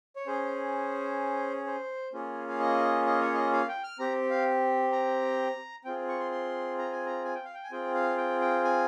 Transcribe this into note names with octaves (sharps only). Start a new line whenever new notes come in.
C#5
C#4 G#4 C5
C5
A#3 C#4 F4 G#4
F5
D#5
D#5
C#5
D#5
F5
G5
F6
C4 G4 A#5
F5
A#5
C4 F4 G#4 G5
C#6
C6
C6
A#5
G#5
A#5
G#5
G5
F5
G5
G#5
C4 F4 G#4 G5
F5
G5
G5
G#5